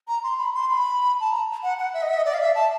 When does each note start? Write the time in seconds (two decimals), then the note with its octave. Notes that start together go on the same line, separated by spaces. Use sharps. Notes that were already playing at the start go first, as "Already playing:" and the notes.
0.08 A#5
0.23 C6
0.38 B5
0.54 C6
0.70 B5
1.20 A5
1.32 A#5
1.63 F#5
1.78 F#5
1.94 E5
2.02 D#5
2.09 E5
2.18 D#5
2.25 D5
2.34 F5
2.41 E5
2.55 A5